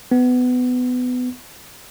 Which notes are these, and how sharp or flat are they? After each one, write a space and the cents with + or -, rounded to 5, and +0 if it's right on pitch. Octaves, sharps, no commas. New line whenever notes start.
B3 +20